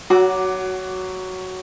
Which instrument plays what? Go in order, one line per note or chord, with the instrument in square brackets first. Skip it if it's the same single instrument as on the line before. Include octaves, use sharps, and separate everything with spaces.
[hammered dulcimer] F#3 D6 [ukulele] F#4